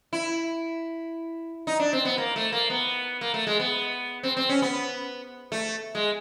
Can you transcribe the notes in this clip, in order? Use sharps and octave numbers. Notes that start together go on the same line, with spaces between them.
E4
D#4
D4
C4
B3
A#3
A3
A#3
B3
A#3
A3
G#3
B3
C4
C4
C#4
B3
A3
G#3